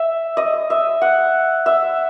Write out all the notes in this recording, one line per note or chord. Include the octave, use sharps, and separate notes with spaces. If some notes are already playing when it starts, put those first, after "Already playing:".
Already playing: E5
D#5
E5
F#5
E5